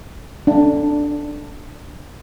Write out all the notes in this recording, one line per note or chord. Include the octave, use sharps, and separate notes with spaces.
D4